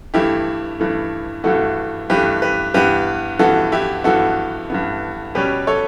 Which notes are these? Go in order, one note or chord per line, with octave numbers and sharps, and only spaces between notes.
G2 E3 A3 E4 G4
G2 E3 A3
G2 E3 A3 F#4 A4
G2 E3 A3 G4 B4
G4 B4
G2 E3 B3 G4 B4
G2 E3 B3 F#4 A4
E4 G4
G2 E3 B3 F#4 A4
G2 E3 B3
B2 G3 C#4 G4 B4
A4 C#5